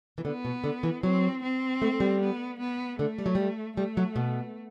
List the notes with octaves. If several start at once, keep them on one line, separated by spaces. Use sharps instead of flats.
E3
D3 B3
B2
D3
E3
F#3 C4
C4
A3
G3
B3
B3
D3 A3
G3
F#3
G3
G3 A3
F#3
B2